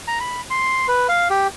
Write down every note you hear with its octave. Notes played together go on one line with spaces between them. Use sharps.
A#5
B5
C6
B4
F5
G4